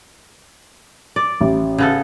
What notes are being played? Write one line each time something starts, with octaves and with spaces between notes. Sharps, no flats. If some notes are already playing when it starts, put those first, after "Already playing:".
D5
A1
C#3 B3 A4